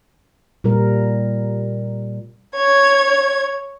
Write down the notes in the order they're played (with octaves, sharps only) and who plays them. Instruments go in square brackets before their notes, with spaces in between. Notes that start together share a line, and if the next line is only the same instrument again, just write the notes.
[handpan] A#2 G3 A#4
[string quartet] C#5 G#6